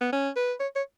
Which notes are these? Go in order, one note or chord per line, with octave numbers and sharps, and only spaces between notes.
B3
C#4
B4
C#5
C#5